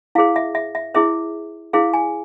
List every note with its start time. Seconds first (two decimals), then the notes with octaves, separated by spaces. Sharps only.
0.15 E4 G#4 C5 F5
0.36 E5
0.55 E5
0.75 E5
0.95 E4 G#4 C5 E5
1.73 E4 G#4 C5 F5
1.94 G#5